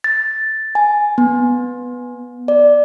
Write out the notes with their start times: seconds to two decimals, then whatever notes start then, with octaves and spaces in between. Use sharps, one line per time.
0.04 A6
0.75 G#5
1.18 B3
2.48 D5